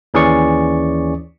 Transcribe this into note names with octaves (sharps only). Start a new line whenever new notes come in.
D#2 E3 C#4 G#4 D5 C#6